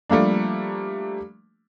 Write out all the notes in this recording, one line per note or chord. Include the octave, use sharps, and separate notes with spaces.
F3 G3 A3 A#3 D4